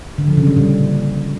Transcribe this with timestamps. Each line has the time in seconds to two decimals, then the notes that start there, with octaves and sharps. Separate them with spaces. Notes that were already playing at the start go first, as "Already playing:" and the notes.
0.18 D3
0.28 F3
0.37 C#3
0.47 G3
0.57 A#2